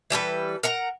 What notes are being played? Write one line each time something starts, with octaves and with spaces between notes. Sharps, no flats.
E3 G3 A4 B4
A#4 F#5 A#5